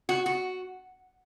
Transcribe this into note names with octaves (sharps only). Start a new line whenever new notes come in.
F#4
F#4